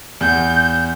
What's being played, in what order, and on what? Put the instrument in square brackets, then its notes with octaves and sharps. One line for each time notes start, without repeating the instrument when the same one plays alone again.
[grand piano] E2 [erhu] G6